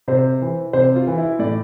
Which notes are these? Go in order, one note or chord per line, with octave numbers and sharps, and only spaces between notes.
C3 C5
E3
C3 C5
F4
E3
E4
A2 D5